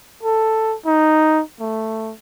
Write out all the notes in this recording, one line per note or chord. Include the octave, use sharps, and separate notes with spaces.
A4
D#4
A3